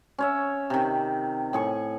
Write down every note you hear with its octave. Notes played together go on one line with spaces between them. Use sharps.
C#4 C#5 E5
C3 D#3
A2 G#4 C#6